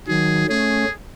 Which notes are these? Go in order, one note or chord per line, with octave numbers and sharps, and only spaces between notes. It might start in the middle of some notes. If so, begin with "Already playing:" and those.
D#3 F#3 G#4
A3 C#4 G#4